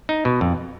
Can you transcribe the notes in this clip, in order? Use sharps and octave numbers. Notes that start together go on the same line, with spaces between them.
D#4
B2
F2